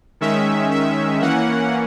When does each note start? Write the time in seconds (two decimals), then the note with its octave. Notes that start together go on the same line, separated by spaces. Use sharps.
0.21 D#3 G#3 C#4 E5
0.71 E5
1.21 E3 A#3 C#4 F#5